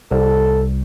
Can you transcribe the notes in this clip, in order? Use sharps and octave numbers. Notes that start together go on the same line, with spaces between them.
C2 A4